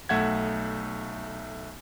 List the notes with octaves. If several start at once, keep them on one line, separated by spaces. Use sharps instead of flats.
B1 A3 E5 F#5 G#6